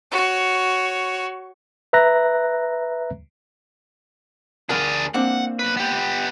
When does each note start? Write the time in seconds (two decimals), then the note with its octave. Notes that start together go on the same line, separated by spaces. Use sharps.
0.11 F#4 C#5
1.93 B4 E5 A#5 F#6 A#6
4.69 D2 D4 G#4 A#4 F#5
5.14 A#3 C4 D4 F#5
5.59 B1 B4
5.77 B3 G4